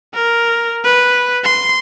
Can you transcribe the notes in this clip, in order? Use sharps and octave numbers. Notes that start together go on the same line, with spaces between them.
A#4
B4
C6